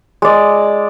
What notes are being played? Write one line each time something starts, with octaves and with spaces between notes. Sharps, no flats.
G#3 D5